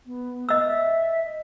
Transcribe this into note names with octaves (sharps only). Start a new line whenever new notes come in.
B3
D#5 E6
E5
D#5